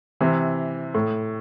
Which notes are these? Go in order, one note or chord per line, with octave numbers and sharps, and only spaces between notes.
C3 E3
A2